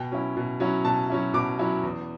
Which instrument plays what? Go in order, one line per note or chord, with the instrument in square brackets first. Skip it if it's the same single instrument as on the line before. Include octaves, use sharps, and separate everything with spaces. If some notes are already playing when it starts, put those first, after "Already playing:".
Already playing: [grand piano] B2 G5
F#3 C#4 E4
B2
F#3 C#4 E4
B2 A5
F#3 C#4 E4
B2 D6
F#3 C#4 E4
E2